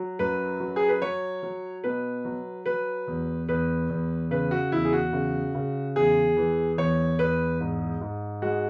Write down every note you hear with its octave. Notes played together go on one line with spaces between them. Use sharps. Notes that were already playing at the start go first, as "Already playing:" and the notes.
Already playing: F#3
F#2 B4
F#3
G#4
B4
F#3 C#5
F#3
B2 B4
F#3
F#3 B4
E2
E2 B4
E2
C#3 B4
F#4
E2 E4
G#4
F#4
C#3
C#3
E2 G#4
E3
E2 C#5
E2 B4
G#2
G#2
G#3 F#4